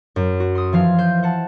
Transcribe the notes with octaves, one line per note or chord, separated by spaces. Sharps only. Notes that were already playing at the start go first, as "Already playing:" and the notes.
F#2
F#4
C6 D#6
E3 F3 F5 G#6
C5 G6
C5 F#5 A5